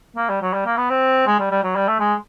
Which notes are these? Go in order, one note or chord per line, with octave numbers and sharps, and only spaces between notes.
A#3
G3
F#3
G3
A#3
B3
C4
G#3
G3
G3
F#3
G3
A3
G#3